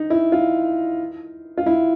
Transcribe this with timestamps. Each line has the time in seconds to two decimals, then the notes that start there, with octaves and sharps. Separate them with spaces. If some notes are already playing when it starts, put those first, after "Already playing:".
Already playing: D#4
0.10 E4
0.32 F4
1.57 F4
1.66 E4